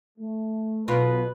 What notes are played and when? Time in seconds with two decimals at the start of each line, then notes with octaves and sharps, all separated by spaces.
0.18 A3
0.88 B1 B2 F4 B4